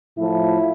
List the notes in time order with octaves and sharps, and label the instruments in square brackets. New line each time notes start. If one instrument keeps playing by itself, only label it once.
[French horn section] A2 F3 E4